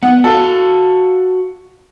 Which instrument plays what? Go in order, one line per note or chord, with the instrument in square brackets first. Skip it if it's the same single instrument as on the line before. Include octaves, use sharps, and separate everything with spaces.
[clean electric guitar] B3 [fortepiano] F#5
[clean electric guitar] F#4 F5 [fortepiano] A4